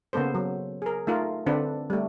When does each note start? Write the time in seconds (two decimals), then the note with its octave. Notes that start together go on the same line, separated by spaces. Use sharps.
0.13 C#3 A#3 B3 A4 C5
0.35 F#3
0.82 G#4 A#4
1.07 A3 D#4 F4 A#4
1.46 D3 C4 D4 A4 B4
1.90 G3 A3